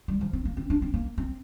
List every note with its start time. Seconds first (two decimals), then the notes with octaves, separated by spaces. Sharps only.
0.08 G3
0.21 F3
0.33 C4
0.45 A#3
0.57 C4
0.70 D4
0.82 C4
0.94 A#3
1.18 C4